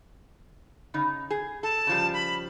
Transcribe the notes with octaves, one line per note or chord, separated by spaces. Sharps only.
C#3 D#4
G#4
A4 A5
C#3 F3 G3
B5